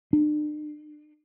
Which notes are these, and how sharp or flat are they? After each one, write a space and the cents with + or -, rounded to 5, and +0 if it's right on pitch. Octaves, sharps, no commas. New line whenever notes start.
D4 +40